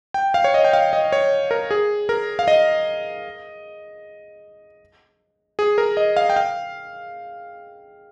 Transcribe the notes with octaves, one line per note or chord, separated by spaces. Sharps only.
G5
F5
C#5
D#5
G5
F5
D#5
C#5
A#4
G#4
A#4
F5
D#5
G#4
A#4
D#5
F5
G5
F5